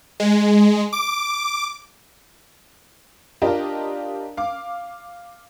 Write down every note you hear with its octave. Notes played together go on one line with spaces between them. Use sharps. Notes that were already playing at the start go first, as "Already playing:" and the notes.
G#3
D6
D4 F4 G4 A#4 D#5
F5 D6